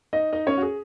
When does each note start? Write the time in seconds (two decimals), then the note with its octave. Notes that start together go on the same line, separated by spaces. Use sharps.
0.13 D#4 D#5
0.33 D#4 D#5
0.47 C#4 C#5
0.58 F#4
0.62 G#4